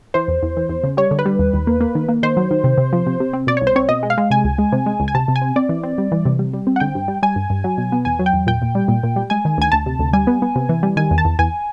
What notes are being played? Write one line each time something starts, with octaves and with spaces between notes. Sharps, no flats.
E3 C5
E2
E2
E3
E2
C#3
G3 C#5
D3
B4
G3
D#2
D#2
A#3
A#3
D#3
A#3
D#3 C5
F#3
D#3
C3
C3
F3
C3
C3
C4
B2 D5
C2 C#5
C5
C4 C#5
B2 D#5
G#3
F5
G#3
C3 G#5
C#2
G#3
C3
G#3
C#2
G#5
C3 A5
C3
G#5
C4
C4 D5
E3
C4
G3
E3
C3
G3
G3
C4
F#5
D3 G5
G2
G3
G3 G#5
G2
G2
F#3
B2
B3
E2 G#5
F#3
G5
E2
A#2 G5
A#2
G3
A#2
A#2
G3
G#3 G#5
D#3
D2 G#5
D2 A5
C3
D2
G3 G#5
B3
B3
C3
E3
G3
D#3 G#5
E2
A5
E2
E2 G#5